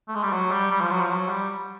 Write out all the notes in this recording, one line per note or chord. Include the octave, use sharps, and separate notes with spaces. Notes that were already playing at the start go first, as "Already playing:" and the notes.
A3
G#3
G3
F#3
G3
G3
F3
F#3
F3
F#3
G3